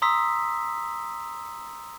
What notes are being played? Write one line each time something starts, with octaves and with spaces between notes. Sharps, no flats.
A#5 C6 D#6 E6 B6